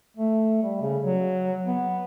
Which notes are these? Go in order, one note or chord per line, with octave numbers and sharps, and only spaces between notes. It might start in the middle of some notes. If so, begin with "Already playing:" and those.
A3
G3
C#3
F#3
B3